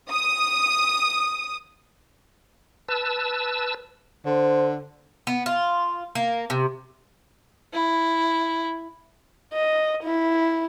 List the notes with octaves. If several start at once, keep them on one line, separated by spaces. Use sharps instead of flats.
D#6
B4 A5 E6
D3 C5
B3
F4
A#3
C3
E4
D#5
E4